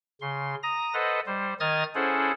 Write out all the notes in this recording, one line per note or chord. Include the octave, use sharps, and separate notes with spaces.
C#3 C6
A#5 D#6 A#6
A4 B4 C5 D#5 F#5
G3 C5
D#3 D#5 D#6 F6 G#6 A6
C#4 E4 G#4 A4 C5 F#5